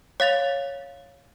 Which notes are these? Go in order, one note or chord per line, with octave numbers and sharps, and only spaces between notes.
C#5 F5 A6 F7